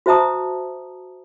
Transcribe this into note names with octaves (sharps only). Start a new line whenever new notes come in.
F#4 C5 E5 A5 A#5 D#6